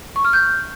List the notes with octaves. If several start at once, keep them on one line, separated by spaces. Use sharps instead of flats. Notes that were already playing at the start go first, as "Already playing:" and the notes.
C#6
F6
G6